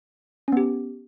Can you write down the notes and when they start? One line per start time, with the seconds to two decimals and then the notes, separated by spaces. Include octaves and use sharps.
0.48 C#4
0.52 B3
0.57 G4